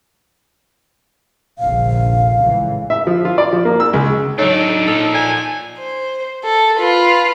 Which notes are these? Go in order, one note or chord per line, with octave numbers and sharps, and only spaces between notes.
F1 A#1 D3 F5
C#2 A2 E3
E5
F3
F4
D5
F3
A#3
E6
C#2
F#3 D4 D#4 A4 C#5
A#2 F3 A4 A5
D5 G#5 A5
C5
A4
F4 B4